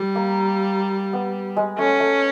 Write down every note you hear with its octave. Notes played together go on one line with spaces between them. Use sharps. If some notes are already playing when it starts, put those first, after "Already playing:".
Already playing: G3
A#3
B3
G#3
A3 C#4
A3